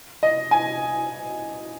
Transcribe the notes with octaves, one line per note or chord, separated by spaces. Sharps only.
D#5
G#5